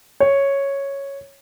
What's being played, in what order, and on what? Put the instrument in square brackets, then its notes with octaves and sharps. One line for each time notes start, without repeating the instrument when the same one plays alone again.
[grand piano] C#5